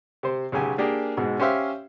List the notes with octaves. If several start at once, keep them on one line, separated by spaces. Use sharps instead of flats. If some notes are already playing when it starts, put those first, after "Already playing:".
C3 C5
B1 C#3 G4 G#5
A#3 D4 G4 G#4 A#4
G#2 B2 G#3
C#4 G4 C5 E5 F5